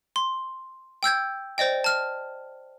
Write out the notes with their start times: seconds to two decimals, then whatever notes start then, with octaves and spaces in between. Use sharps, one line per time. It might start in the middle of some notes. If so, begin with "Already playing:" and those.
0.16 C6
1.03 G5 E6 G6 G#6
1.58 C5 D5 D#5 G5
1.84 A5 F6